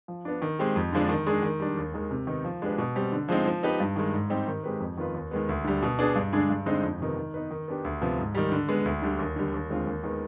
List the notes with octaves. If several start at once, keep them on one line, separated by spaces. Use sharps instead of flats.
F3
B3 D4
D#3
G#3 C4 G4
F2
D3 F3 G#3 D4
D#3
G#3 D4 G#4
D#3
G3 D4
D#2
D#3 G#3
C3
D#3 B3 D#4
F3
G#3 D4 G4 B4
B2
G3 C4
D3
F3 G#3 C4 D#4
F3
B3 D#4 G4 B4
G2
D#3 G#3
G#2
G3 C4 D#4 G4
D#3
G#3 C4 G4 B4
F2
D#3 B3 F4 B4
D#2
D#3 G#3 B3
D2
D3 G3
B2
B3 D4 G#4
G2
D3 G#3 D4 G#4
G2
D3 G#3 C4 D#4
F2
C3 D#3 B3
D#3
B3 D#4 B4
D#3
B3 D4 G4
D2
C3 F3 B3
G#2
D#3 G3
D3
G#3 B3
D2
D3 G3
D#2
D3 G3
D#2
D3 G#3 C4 F4
D#2
D#3 G#3 B3